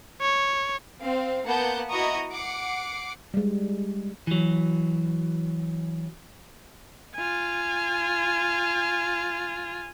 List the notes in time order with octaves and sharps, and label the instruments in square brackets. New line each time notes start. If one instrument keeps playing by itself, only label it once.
[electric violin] C#5
[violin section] C4 F5
A#3 B3 F#5 A5 G6
E4 F#4 D#5 A#5 C#6 D#6
F#5 D6 C7
[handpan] G3 G#3
[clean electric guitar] E3 F#3
[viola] F4 G#5